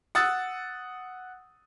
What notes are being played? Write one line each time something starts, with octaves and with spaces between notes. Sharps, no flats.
F#5 D#6 E6 A6